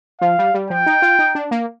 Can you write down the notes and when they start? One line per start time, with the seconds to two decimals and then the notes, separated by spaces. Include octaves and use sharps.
0.21 F3 F5
0.39 G3
0.54 G3
0.70 F3 G5
0.86 D#4
1.02 F4
1.19 D#4
1.35 D4
1.51 A#3